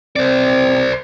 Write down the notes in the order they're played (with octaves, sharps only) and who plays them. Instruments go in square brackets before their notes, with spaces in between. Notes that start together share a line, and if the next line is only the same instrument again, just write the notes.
[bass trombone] C4 [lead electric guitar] C5 D5